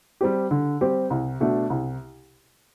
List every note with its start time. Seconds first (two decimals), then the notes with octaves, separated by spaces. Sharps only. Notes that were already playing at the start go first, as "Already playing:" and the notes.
0.21 G3 C4 G4
0.51 D3
0.81 G3 C4 G4
1.10 C2
1.41 B2 A3 D4
1.70 C2